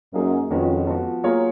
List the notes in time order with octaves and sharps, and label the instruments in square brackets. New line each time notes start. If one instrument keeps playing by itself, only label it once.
[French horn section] F#2 [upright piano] A#3 D#4 G#4
[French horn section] F2 [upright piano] D#3 G#3 C#4 F#4 B4
[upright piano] F3 B3 F#4
F#3 A#3 F4 G#4 C#5